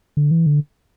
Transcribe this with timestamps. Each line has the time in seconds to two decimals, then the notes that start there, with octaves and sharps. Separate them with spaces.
0.17 D3
0.31 E3
0.46 D3